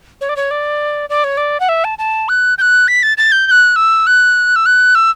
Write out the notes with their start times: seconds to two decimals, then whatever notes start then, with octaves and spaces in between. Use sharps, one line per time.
0.21 C#5
0.29 D5
0.37 C#5
0.51 D5
1.10 D5
1.24 C#5
1.37 D5
1.60 F#5
1.69 E5
1.84 A5
1.98 A5
2.29 F#6
2.58 G6
2.61 F#6
2.88 B6
3.03 A6
3.17 A6
3.32 G6
3.47 G6
3.51 F#6
3.76 E6
4.07 F#6
4.56 E6
4.66 F#6
4.95 E6